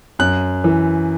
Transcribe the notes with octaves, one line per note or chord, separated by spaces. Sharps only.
F#2 F#6
E3